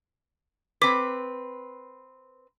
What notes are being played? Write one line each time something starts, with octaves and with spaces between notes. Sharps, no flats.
C4 B4 D6 B6